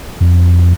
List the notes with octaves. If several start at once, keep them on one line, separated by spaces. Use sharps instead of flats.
F2